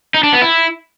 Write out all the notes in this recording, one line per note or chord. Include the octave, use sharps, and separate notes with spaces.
D#4
D4
B3
E4